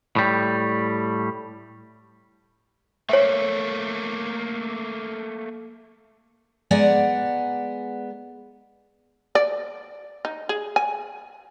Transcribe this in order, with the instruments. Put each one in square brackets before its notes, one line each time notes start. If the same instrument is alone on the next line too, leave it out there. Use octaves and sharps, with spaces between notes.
[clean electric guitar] A2 G3
[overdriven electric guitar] A3 A#3 [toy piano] C#5 E5
[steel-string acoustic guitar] G#3 B3 D5 F#5 G#5 A#5
[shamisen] D5
D#4
G#4
G#5